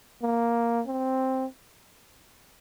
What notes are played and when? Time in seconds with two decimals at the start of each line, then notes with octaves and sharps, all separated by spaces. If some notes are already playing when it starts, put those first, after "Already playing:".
0.22 A#3
0.87 C4